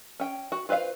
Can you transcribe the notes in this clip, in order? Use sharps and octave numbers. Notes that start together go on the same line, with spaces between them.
C#4 G5
F#4
F4 B4 C5 E5 F5